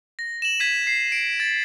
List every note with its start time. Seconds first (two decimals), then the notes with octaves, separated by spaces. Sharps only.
0.19 A#6
0.42 E7 F#7
0.60 G#6 B6 D#7
0.87 C7
1.12 D7
1.40 A6